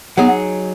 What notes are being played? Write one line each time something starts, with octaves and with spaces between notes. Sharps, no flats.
F#3 B3 D#4 G#4